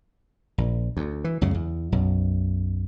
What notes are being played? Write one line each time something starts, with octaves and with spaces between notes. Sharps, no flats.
A#1
D2
E3
C#2 F#2 C#3
E2
B1 F#2